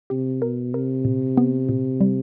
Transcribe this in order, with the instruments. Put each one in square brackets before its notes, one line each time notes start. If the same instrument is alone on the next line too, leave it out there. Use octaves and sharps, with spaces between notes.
[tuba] C3 [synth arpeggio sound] G4
[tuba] B2 [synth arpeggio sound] A#4
[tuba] C3 [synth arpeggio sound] A#4
[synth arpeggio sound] A#2
B3
A#2
G3